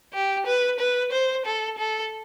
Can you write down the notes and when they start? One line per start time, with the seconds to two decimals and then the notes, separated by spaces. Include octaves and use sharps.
0.14 G4
0.46 B4
0.79 B4
1.12 C5
1.45 A4
1.78 A4